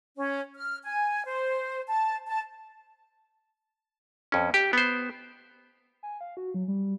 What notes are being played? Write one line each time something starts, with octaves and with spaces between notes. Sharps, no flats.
C#4
F6
G#5
C5
A5
A5
F2 C#4
G4
B3 C5
G#5
F5
F#4
F#3
G3